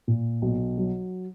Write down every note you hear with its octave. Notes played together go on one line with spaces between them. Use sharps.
A#2
B1
F#3